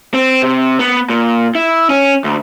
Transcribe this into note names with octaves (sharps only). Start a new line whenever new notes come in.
C4
C3
B3
A#2
E4
C#4
D2